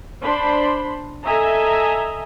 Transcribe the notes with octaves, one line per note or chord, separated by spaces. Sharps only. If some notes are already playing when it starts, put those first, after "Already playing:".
D4 C5 B5 C6
A4 D#5 E5 G#5 A#5